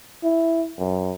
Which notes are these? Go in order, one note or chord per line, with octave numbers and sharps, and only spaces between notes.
E4
F#2